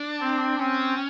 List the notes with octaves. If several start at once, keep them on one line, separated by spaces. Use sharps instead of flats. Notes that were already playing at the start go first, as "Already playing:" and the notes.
Already playing: D4
C4
C4 C#4